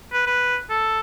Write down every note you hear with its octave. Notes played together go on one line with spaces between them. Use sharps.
B4
B4
A4